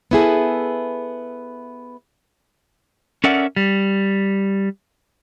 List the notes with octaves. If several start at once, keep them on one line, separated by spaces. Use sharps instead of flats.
B3 E4 G#4 A4
C#4 A4 A#4 D5 E5 F#5
G3